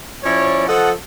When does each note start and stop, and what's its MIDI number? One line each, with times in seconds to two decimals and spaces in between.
0.23 0.67 53
0.23 0.67 61
0.23 0.67 64
0.23 0.67 73
0.23 0.67 74
0.68 0.91 53
0.68 0.91 69
0.68 0.91 75
0.68 0.91 78